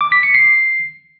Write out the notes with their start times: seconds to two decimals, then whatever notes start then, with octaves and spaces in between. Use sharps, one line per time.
0.01 D6
0.12 B6
0.23 C#7
0.34 C7